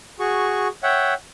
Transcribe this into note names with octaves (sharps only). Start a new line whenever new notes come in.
F#4 G#4 C#6
C#5 E5 F#5 G5